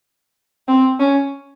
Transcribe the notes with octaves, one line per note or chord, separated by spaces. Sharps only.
C4
C#4